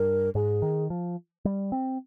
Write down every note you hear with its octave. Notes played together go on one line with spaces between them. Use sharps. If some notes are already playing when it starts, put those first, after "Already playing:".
Already playing: G2 A#4
G#2 G#4
D#3
F3
G3
C4